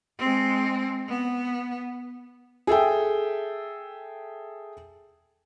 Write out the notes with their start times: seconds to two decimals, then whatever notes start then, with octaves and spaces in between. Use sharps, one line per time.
0.19 G#3 C4
1.09 B3
2.67 G#4 A4 E5 G5